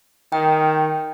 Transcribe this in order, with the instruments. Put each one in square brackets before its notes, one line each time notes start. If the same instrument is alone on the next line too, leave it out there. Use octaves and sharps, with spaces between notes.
[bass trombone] D#3 [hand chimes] G5